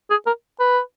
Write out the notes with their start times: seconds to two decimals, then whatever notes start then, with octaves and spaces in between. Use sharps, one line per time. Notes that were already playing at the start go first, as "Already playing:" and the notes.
0.10 G#4
0.26 A#4
0.60 B4